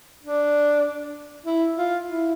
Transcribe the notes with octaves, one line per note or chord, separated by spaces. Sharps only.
D4
E4
F4
E4